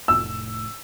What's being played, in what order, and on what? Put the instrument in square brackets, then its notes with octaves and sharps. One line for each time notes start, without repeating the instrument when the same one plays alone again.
[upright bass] F1 A2 [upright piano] E6